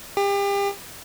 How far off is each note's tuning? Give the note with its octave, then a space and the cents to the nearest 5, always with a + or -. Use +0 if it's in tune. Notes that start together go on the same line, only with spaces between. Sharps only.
G4 +35